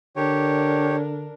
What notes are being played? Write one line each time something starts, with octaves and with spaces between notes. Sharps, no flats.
D3 D4 G4 A#4 C#5